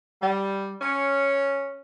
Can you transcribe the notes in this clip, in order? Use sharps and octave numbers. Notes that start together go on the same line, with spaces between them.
G3
C#4